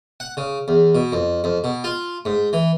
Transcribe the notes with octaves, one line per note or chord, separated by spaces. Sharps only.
F#5
C#3
E2
B2
F2
F2
B2
F4
G#2
E3